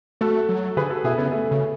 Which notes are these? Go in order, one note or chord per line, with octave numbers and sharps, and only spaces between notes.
A3 F#4 A4
F#3
D3 G#4 B4
F#4 A4
B2 E4 G#4
C#3 B3
A3
C#3